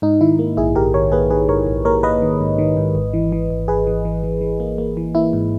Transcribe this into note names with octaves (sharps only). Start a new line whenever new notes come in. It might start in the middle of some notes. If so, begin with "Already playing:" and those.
G#2 D#4
D#3 E4
A#3
A#1 E4 G#4
A#1 G4 A#4
D#3 A#4 C#5
A#3 G#4 B4
D#3 G#4 B4
G#2 A#4 C#5
A#1
A#3 A#4 C#5
A#3 B4 D#5
D#3
G#2
D#3
G#2
G#1
E3
E3
G#1
G#1 G#4 B4
E3
E3
E3
E3
A#3
A#3
E3
A#3 E4
G#2